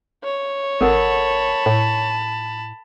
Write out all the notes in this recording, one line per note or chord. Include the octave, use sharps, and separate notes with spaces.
C#5
G#1 A4 A#4 F#5 A5 B5
A2